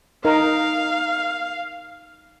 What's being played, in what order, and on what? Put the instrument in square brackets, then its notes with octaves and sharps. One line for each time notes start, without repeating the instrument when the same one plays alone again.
[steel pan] D#4 A#4 [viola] F5